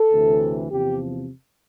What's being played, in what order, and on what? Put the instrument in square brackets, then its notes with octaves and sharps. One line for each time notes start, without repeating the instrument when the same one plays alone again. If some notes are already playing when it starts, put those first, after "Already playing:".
Already playing: [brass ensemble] A4
D2 C3 E3
E2 C3 F3 G4